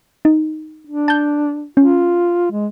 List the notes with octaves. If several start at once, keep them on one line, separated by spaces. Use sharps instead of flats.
D#4
D4
A5 G6
C#4 F4
G#3